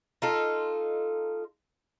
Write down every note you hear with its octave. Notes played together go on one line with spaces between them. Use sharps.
D#4 F4 A4